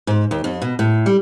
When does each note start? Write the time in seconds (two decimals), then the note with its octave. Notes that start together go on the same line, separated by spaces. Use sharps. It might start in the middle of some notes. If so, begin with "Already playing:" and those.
0.07 G#2
0.31 D#2
0.44 F2
0.62 B2
0.79 A2
1.06 G3